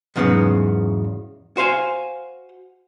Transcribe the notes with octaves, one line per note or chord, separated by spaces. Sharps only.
E2 G#2 C#3 F#3 B3
F#4 C5 F5 G#5